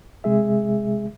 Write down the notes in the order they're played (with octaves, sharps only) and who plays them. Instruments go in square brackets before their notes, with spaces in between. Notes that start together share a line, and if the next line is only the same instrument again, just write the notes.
[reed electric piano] C3 G#3 G#4 E5